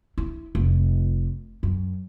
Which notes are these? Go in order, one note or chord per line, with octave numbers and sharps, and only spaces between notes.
E4
F1
F#2